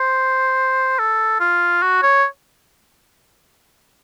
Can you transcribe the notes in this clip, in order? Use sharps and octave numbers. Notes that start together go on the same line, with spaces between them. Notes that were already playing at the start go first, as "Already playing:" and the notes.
Already playing: C5
A4
F4
F#4
C#5